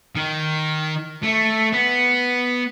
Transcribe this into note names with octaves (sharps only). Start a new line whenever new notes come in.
D#3
A3
B3